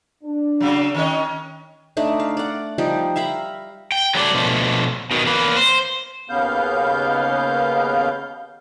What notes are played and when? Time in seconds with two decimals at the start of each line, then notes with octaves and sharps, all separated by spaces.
0.24 D4
0.60 C#3 F#3
0.94 D#3 C#4 D#5
1.97 A3 D4 D#4
2.20 F5
2.37 D5 F#5
2.78 F3 G3 D#4 G5
3.16 E5 F5 A#5 B5
3.92 G5
4.15 F#3 G3 A3 D4 A4 D5
4.34 B2 D3 F3 A3
5.11 B2 D#3
5.26 E2 A#3 B4
5.57 C5
6.30 D#2 C#3 B3 F5 G6